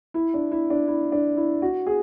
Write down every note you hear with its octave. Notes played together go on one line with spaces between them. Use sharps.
E4
D4
E4
D4
E4
D4
E4
F#4
G#4